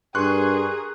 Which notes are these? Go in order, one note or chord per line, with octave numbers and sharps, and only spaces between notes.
G2 G#4 A#4 C6 C#6 F#6